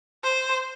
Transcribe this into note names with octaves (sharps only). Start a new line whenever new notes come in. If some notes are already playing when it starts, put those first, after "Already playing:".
C5